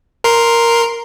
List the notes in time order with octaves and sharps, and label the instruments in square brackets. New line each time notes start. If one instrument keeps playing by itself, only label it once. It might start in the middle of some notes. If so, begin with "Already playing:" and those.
[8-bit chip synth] A#4 C6